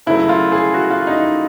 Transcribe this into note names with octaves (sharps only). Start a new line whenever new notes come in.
F#2 C#3 F#3 A3 E4
F4
G#4
F#4
F4
D#4